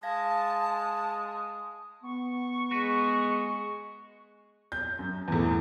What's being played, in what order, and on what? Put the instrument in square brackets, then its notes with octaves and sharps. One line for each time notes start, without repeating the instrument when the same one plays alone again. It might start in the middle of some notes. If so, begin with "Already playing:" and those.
[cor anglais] G#3 [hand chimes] F5 G#6 A#6 [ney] A5
[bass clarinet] B3 [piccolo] C#6
[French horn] G#3 [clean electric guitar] F#4 B4
[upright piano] G6
F#2
E2 A2